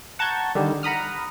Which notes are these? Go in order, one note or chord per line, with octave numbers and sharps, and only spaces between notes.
F#5 A5 A#5 C#6 G6 G#6
D3 D#3 G3 D#4
F#5 A#5 B5 D#6 F6